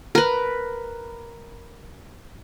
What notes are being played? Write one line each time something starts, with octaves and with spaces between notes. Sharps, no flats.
A#4 B4